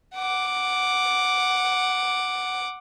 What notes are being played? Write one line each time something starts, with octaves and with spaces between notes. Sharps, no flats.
F#5 D6